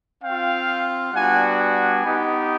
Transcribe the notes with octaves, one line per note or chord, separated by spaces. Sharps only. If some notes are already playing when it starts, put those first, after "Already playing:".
C4 F4 F5 G5
G3 B3 D4 F#4 F#5 G#5
F#5 G#5
B3 D#4 G4